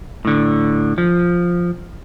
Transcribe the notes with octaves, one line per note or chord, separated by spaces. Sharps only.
A2 D3
F3